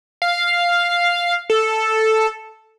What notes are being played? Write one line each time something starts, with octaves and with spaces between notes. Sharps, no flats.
F5
A4